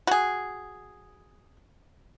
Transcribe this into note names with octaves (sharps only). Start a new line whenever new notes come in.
F#4 G#4